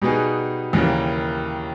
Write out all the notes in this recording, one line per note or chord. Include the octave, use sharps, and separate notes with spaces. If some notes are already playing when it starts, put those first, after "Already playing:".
B2 G3 B3 D#4 G#4
D#2 C#3 E3 G3 A#3